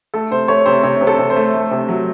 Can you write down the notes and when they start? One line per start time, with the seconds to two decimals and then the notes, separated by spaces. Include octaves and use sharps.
0.14 A3 A4
0.31 C3 C5
0.48 A3 C#5
0.66 C3 C5
0.83 C3 C#5
1.01 C3
1.07 A4
1.19 C3
1.30 C5
1.36 A3
1.54 A3
1.71 C3
1.89 F#3